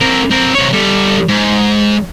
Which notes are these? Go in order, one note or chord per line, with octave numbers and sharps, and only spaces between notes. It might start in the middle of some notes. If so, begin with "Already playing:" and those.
C4 A#4
C4 A#4
C3 C#5
G3 A4
G#2